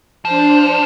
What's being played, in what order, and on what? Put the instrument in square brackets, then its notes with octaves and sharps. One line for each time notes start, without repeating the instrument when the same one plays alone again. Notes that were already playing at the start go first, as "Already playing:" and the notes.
[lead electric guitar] F3 [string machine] D4 C5